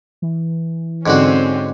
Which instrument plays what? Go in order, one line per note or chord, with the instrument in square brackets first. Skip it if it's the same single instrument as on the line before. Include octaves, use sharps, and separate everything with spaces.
[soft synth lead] E3
[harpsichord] G#2 D3 F#4 [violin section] C4 C#4